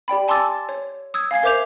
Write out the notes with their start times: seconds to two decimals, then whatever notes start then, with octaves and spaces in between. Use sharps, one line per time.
0.08 G4 D5 G5 B5
0.28 G#5 A5 C6 D6 E6 A6
0.69 C#5
1.14 D#6 E6 G#6
1.31 F5 G#5 G#6 C7
1.43 A#4 C5 E5 D6 G6 F7